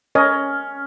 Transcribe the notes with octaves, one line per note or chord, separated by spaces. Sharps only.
C#4 A#4 C#5 D#5